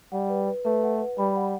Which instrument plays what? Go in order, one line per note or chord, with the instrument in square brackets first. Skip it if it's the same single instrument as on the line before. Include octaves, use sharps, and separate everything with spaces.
[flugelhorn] G3 [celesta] F#5
[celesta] B4
B4
[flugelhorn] A3 [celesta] B4
[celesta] F#5
B4
[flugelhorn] G3 [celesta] B5
[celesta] F#5